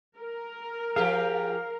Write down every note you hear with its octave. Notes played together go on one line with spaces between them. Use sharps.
A#4
F3 G4 G#4 F5